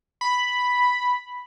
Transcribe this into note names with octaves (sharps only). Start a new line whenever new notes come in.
B5